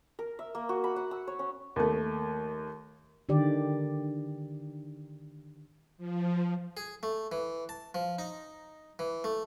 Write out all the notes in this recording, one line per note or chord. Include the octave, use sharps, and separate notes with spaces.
A#4
E5
A#3
F#4
B5
F#5
E6
C#5
C#4
D#2 A3
D3 D#3 G4 D5
F3
G#4
A3
E3
A5
F3
D#4
E3
A3